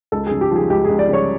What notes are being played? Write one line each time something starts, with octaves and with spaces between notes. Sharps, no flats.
C#2 A4
C#3 G#4
G4
F3 G#4
C#2 G4
G#4
C#2
D5
C#3 C#5